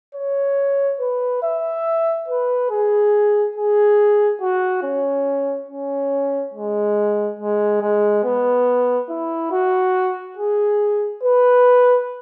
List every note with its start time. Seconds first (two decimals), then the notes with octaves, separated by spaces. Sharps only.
0.15 C#5
1.00 B4
1.43 E5
2.28 B4
2.70 G#4
3.56 G#4
4.41 F#4
4.83 C#4
5.69 C#4
6.54 G#3
7.39 G#3
7.82 G#3
8.24 B3
9.09 E4
9.52 F#4
10.37 G#4
11.23 B4